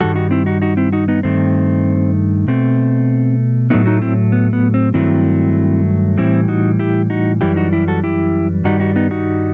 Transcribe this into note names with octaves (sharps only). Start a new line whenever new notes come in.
G2 D#3 G3 F#4 A4
D#4 F#4
C4 E4
D#4 F#4
D#4 F#4
C4 E4
D#4 F#4
B3 D#4
G2 D#3 A3 C4
B2 A3 C4
A2 F#3 A3 B3 D#4
D#4 F#4
C4 E4
B3
B3
C4
G2 D#3 F#3 A3 C4 E4
A2 E3 G3 C4 E4
D#4 F#4
E4 G4
D#4 F#4
F#2 E3 G3 E4 G4
D#4 F#4
E4 G4
F#4 A4
E4 G4
G2 D#3 G3 D#4 F#4
D#4 F#4
B3 D#4
D#4 F#4